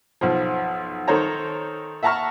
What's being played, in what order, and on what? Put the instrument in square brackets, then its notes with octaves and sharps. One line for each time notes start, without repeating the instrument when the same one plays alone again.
[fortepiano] B1 F3
D#3 A4 C5 C#5 A#5
E5 F#5 A5 A#5 C#6 F6